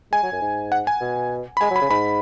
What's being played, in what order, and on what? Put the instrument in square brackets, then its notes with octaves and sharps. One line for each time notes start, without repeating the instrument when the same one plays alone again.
[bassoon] G#3 [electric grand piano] G#5
[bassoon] F#3
F#2
G#2
[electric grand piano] F#5
G#5
[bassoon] B2
[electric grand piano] B5
[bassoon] G#3 [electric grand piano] G#5
[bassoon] F#3
[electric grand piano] B5
[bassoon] C#3
[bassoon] G#2 [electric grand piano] B5